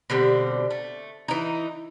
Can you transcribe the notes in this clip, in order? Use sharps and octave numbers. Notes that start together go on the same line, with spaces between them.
B2 D3 G3 C4
A3
E3 D#4